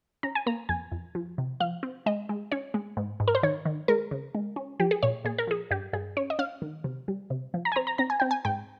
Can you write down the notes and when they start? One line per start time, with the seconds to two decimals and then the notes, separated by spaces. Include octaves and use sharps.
0.23 C#4 A#5
0.35 G#5
0.46 A#3 A#5
0.69 F2 G#5
0.92 F2
1.15 F3
1.38 C3
1.60 F3 F5
1.83 C4
2.06 G#3 D#5
2.29 G#3
2.52 C#4 C#5
2.74 G#3
2.97 G#2
3.20 G#2
3.28 A#4
3.35 C5
3.43 D#3 C#5
3.65 D#3
3.88 G#3 A#4
4.11 C#3
4.35 G#3
4.56 C#4
4.79 F3 G4
4.91 G#4
5.03 A#2 C#5
5.25 A#2 G#4
5.38 A#4
5.47 F3 G#4
5.71 G2 G4
5.93 G2 G#4
6.17 C#4 C#5
6.30 D#5
6.39 C#4 F5
6.62 D#3
6.84 C3
7.08 G3
7.30 C3
7.54 F3
7.65 A#5
7.72 G#5
7.76 C4 A#5
7.87 A#5
7.98 C4 A#5
8.10 G#5
8.20 C4 G5
8.31 G#5
8.45 G#2 G5